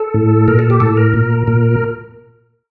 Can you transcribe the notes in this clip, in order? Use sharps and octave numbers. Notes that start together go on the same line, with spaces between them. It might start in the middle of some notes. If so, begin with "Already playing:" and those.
Already playing: A4
A2
A#2 A#4
A4
G4
A2 A4
A#4
A#2
A#2